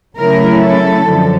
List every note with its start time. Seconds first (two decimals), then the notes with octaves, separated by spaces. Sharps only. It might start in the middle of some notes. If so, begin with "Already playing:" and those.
0.17 C#3 F#3 A3 C#4 E4 A#4
0.61 A4
1.06 F#2 D3 F3